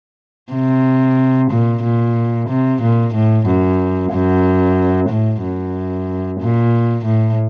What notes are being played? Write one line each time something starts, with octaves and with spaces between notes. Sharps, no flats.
C3
A#2
A#2
C3
A#2
A2
F#2
F#2
A2
F#2
A#2
A2